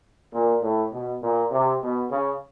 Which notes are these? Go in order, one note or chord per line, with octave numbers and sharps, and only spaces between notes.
A#2
A2
B2
A#2
C3
B2
C#3